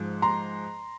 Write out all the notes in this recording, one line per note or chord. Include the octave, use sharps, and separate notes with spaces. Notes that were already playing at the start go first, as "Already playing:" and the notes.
Already playing: G#2 F3 G#3
A#5 C6